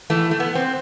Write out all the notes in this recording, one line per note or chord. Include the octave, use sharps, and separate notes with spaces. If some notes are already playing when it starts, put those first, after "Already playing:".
A2 E3 A3
A3
B3
C4